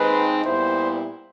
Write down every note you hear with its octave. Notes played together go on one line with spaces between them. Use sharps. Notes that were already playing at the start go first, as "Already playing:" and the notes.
Already playing: D#2 D#3 G#3 C4 D#4 B4
A#2 G3 B3 E4 C5